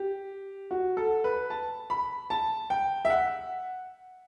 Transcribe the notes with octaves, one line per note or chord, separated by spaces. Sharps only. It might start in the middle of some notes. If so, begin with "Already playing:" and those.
Already playing: G4
F#4
A4
B4
A5
B5
A5
G5
E5
F#5